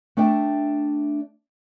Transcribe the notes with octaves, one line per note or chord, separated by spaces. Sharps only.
A3 D4 E5 G5